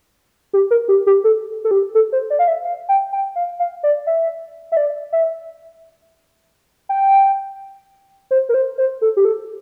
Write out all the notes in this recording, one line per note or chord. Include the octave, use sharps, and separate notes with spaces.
G4
A#4
G4
G4
A4
A4
G4
A4
C5
D5
F5
E5
F5
G5
G5
F5
F5
D5
E5
E5
D5
E5
G5
C5
A#4
C5
C5
A4
G4
A4